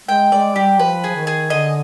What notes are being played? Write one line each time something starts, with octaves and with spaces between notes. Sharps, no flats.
G#3 G5
G#3 D5
G3 G4
F3 B4
G#4
F3
D#3
G#4
D3 D#5